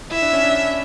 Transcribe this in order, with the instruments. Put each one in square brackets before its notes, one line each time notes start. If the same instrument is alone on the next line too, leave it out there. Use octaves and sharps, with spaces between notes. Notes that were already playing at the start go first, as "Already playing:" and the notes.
[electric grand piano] E4 [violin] E5
[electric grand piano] D4
C#4
D4